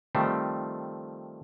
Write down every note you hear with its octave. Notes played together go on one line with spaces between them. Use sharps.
D#3 F3 G3 A3 C4